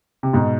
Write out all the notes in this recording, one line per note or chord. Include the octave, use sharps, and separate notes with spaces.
C3
G#2 B2